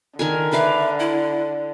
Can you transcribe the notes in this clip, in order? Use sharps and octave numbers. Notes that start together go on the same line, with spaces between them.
D3 D#3 A#4 G#5
B4 D5 E5 F5
E4